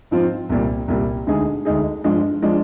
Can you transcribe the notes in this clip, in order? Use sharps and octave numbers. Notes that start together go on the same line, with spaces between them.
G#2 F3 C4 F4
C2 A#2 G3
C2 A#2 G3
D2 D3 G#3 D#4 G#4
D2 D3 G#3 D#4 G#4
G2 F3 G#3 D4
F3 G#3 D4